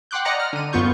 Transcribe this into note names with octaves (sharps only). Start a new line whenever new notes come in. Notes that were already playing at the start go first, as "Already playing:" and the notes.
F#5 G5 C6 D6 F#6 G6
D5 D#5 F#5 A#5 A#6 C#7
F6
D3 D#7
F#2 B3 F4 C#6 G6